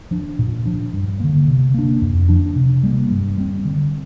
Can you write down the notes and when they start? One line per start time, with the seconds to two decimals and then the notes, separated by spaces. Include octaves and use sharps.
0.11 F3 D4
0.39 A#2
0.66 F3 D4
0.93 G2
1.20 D3 A#3
1.47 C3
1.74 A#3 D4
2.02 F2
2.29 F3 D4
2.56 C3
2.83 G3 A#3
3.10 G2
3.38 G3 C4
3.65 D3